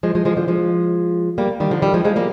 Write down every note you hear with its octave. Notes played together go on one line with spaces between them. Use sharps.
F3 G#3
F3 G#3
F3 G#3
D3 F3
F3 G#3
G3 A#3
D#3 G3
D3 F3
D#3 G3
F3 G#3
F3 G#3
G3 A#3